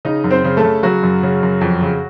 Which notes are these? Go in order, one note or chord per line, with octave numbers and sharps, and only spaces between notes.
C#3 D#4 D#5
F#2
C4 C5
C#3
A3 A4
C#3
C#3 F#3 F#4
F#2
C#3
F#2
F2
C#3